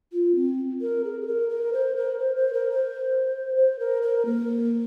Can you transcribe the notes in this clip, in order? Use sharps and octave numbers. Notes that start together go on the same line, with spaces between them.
F4
C4
A#4
G#4
G#4
A#4
A#4
C5
A#4
C5
C5
A#4
C5
C5
A#4
A#4
A#3